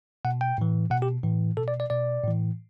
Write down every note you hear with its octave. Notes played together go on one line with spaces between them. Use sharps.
B2 F#5
G5
A2 E3
B2 F#5
G4
A2 E3
B2 A4
D5
D5
B2 D5
A2 E3